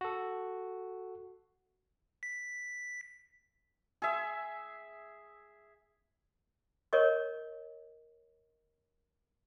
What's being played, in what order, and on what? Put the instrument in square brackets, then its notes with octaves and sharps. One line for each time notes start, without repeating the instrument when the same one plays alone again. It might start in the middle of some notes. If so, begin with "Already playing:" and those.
[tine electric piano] F#4 A4
[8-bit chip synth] B6
[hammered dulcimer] G#4 E5
[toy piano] A#4 C#5 D#5 C#6